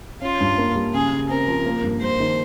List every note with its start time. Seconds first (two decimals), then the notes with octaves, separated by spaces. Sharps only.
0.21 C#4 F4
0.40 G2
0.58 A#3
0.75 G3
0.94 C#3 G#4
1.12 C#3
1.30 C4 A#4
1.48 F3
1.66 A#3
1.84 G2
2.01 G3 C5
2.20 D#3